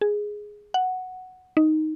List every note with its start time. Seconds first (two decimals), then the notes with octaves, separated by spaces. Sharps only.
0.01 G#4
0.74 F#5
1.57 D#4